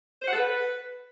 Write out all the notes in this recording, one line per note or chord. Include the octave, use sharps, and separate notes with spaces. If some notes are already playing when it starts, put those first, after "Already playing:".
C5
F#5
A4
B4